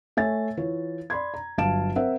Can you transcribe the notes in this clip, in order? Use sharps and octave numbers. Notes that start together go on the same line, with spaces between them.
A3 C#5 E5 G#5 A6
E3 F4 C#5
D5 B5 C6 G#6
A#5
G1 F#3 F5 A5 D7 E7
C4 A#4 E5 F#5